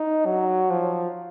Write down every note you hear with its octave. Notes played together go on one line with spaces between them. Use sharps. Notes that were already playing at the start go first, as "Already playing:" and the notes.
Already playing: D#4
F#3
F3